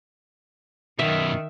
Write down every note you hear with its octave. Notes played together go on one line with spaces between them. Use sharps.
F#2 B2 D#3 E5